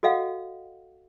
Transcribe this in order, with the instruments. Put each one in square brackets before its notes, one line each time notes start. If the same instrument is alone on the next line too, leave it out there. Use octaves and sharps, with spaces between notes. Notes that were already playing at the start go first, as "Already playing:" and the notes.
[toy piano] F#4 A4 D#5 F5 F#5